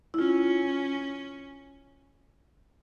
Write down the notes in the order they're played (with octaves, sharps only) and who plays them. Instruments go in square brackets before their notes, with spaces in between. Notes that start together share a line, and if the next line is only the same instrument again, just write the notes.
[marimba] E4
[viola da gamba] C#4 [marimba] F4